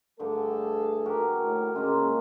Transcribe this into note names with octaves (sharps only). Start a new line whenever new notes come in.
G2 D3 A3 G#4 A4
F#4 G4 A#4
A2
C#3 G#3 A#3 C#4 F4 G#4